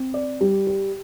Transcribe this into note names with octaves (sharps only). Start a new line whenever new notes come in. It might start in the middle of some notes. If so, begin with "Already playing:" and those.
Already playing: C4
D5
G3
G4